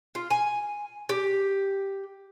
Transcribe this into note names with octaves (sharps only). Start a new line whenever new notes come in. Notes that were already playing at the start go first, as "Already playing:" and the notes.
F4
G#5
G4